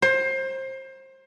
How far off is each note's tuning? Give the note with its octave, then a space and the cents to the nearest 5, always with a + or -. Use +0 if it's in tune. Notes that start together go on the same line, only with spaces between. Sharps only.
C5 +25